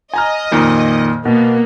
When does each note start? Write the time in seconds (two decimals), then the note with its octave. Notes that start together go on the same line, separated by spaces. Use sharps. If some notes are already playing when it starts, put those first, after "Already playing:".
0.14 D#5 G#5 A#5 F6
0.51 F2 A#2 D#3
1.25 B2 A#3 B3